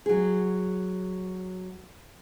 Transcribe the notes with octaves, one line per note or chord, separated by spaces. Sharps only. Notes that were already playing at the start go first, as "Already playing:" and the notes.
F#3 G#4